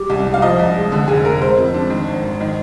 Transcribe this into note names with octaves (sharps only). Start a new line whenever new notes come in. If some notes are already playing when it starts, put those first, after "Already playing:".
Already playing: G3 D6
C2
C2
F5
F3 D#5
C2
G#3
D3
F1 G#4
F1 A#4
G#3 C5
F2
D4
D#3
G#1
G#1
D#3